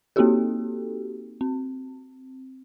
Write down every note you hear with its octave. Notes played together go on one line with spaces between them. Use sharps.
A#3 C4 D#4 F#4 G4 A4
C4